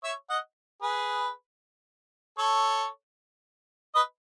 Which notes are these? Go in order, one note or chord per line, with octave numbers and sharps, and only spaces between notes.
C#5 E5
D#5 F#5
G#4 B4
A4 C#5
B4 D#5